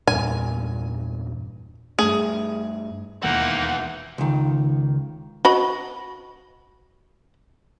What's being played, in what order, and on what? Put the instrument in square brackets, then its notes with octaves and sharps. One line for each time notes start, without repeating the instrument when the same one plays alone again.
[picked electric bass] E2 G2 A#2 [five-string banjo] G#5
[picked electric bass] G2 A3 [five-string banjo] G#4
[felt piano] E1 D#2 [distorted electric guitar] E3 F4 [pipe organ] A#3 D#4 [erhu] F#5
[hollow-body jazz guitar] C#2 D#3
[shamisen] F#4 D#5 B5